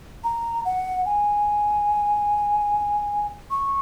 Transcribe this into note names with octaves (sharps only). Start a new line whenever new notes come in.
A#5
F#5
G#5
C#6